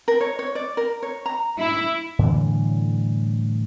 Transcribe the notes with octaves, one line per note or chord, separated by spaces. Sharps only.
A#4
C#5
C#5
D5
A#4
C#5
A#5
E4
A2 D3 E3 G3